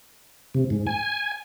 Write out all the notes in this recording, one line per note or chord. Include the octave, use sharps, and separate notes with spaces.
C3
G#2
G#5